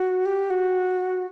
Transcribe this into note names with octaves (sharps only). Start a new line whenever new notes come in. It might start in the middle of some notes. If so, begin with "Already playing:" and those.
Already playing: F#4
G4
F#4